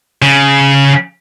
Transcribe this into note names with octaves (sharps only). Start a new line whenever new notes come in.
C#3